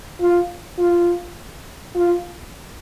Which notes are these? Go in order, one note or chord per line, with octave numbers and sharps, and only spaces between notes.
F4
F4
F4